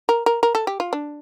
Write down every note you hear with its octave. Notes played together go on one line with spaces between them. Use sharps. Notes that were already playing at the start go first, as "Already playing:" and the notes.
A#4
A#4
A#4
A4
G4
F4
D4